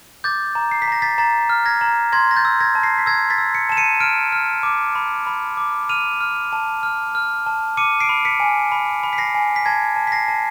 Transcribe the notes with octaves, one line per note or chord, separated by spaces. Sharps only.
D6 G6 A6
A#5
C7
B6
A#5 A#6
A6 B6
A#5 A6 B6
F6
G#6 A#6
A#5
C6 G#6 A#6
A#6
G6 A6
E6
G#6 A#6
A5
A#6 C7
B6
E6 G#6 A#6
A6 B6
E6
B6 C#7
A5 E7
C#7 D#7
F6 D7 E7
F6
D6
B5
B5
D6
F6 D#7 F7
F6
A5
F6
F6
A5
D6 C#7 D#7
C7 D7
B5
B6 C#7
G#5
B5
B5
B6
A#6 C7
G#5
B6
A5 G#6 A#6
A5
B6
A#6 C7
A5